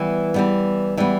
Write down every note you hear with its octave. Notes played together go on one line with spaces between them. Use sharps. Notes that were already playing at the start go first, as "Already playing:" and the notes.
Already playing: E3 G3 B3
E3 G3 B3
E3 G3 B3